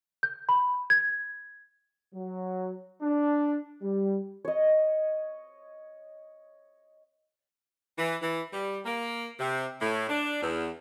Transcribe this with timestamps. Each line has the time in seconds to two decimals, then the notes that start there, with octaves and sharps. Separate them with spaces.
0.23 G6
0.49 B5
0.90 G#6
2.14 F#3
3.02 D4
3.81 G3
4.45 C#5 D#5
7.99 E3
8.22 E3
8.53 G3
8.86 A#3
9.40 C3
9.80 A2
10.09 D4
10.43 E2